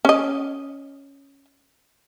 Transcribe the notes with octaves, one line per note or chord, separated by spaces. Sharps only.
C#4 D#5